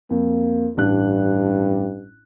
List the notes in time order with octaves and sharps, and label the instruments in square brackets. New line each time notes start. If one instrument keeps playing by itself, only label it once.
[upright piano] F2 [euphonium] A#3
[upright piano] A1 D4 F#6 [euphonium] G2